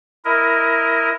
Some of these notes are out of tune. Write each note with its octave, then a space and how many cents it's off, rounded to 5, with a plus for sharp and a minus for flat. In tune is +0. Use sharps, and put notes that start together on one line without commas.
E4 +0 A#4 +0 D#5 +15